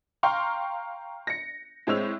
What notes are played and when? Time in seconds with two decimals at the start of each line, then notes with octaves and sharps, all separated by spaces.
0.23 F5 G5 A#5 C6 C#6 F6
1.27 A#6 C#7
1.87 A2 G#3 C4 C#5 E6 F7